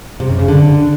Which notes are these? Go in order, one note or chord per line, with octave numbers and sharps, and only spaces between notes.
C3
F#2
C#3
D3